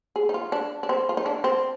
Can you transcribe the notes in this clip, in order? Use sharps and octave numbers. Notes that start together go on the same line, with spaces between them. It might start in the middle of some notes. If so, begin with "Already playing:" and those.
G#4
D#4
F4
D4
D4
C4
F4
D#4
D4
C4